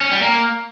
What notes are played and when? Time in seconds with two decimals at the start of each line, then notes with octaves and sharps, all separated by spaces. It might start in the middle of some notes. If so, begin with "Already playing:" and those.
0.01 C#4
0.11 G3
0.22 A#3